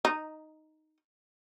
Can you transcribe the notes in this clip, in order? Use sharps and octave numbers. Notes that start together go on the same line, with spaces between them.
D#4